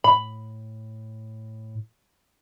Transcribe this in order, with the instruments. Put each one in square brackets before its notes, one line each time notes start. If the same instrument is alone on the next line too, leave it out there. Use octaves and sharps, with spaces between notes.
[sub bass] A2 [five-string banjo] B5